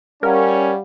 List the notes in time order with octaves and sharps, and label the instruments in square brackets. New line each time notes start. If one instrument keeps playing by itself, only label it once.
[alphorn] G3 [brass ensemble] C#4 [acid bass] A#4 [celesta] F5 F#5